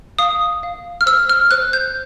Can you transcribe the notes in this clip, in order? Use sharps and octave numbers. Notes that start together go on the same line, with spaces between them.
F5 D#6
F5
F6
C5 E6
F6
C5 F#6
G6